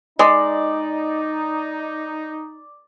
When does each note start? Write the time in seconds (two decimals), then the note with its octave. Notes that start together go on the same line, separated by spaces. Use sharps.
0.19 G#3 D#4 D5